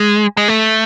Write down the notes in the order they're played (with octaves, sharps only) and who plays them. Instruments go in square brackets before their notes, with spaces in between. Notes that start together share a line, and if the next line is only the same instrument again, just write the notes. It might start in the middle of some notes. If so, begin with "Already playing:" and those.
Already playing: [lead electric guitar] G#3
G#3
A3